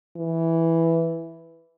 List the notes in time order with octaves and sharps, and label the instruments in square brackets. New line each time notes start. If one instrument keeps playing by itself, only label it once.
[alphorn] E3